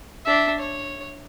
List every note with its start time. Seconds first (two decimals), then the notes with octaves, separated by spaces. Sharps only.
0.25 D4 E5
0.59 C#5